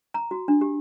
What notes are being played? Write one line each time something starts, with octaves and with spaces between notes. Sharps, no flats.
A#5
F#4
D4
G4